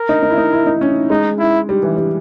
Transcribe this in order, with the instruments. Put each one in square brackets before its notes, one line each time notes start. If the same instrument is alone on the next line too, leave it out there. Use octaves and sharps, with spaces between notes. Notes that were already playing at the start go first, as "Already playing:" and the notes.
Already playing: [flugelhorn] A#4
[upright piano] D#4
D#4
E4
D#4
E4
D#4
C#4
[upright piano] G#3 [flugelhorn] D#4
[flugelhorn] E4
[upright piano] G3
E3
G3